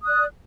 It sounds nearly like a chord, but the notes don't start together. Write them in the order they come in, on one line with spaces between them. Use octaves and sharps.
D#6 F#6 D5